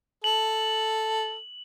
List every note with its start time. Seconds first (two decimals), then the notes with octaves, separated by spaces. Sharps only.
0.24 A4 F#7